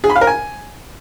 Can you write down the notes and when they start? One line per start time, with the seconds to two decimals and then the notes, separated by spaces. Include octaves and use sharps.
0.04 G#4
0.10 B5
0.15 F5
0.21 A#4
0.27 G#5